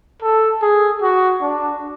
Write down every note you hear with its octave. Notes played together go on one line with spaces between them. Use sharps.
A4
G#4
F#4
D4